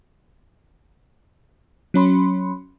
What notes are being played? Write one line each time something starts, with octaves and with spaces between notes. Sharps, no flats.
F#3 C#4 B5 C6